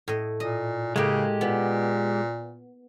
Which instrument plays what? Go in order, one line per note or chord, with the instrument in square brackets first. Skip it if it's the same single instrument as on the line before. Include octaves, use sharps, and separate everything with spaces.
[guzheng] A2 D#5
[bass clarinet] A#2 [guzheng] D#5
[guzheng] A2 A#3 [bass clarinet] C#3 [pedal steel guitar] G#3 G4
[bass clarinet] A#2 [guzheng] B3